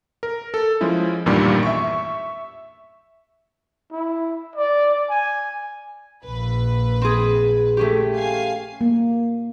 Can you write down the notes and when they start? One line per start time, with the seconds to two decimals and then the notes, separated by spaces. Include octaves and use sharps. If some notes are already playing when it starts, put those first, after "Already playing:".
0.23 A#4
0.54 A4
0.81 F3 G#3 C#4 E4
1.26 A1 E2 G2 A#2 D#3 G3
1.63 E5 C#6
3.92 E4
4.56 D5
5.10 G#5
6.24 A#1 B4
7.02 C4 G#4
7.77 A3 C#4 G4
8.15 F5 G#5 C7
8.81 A#3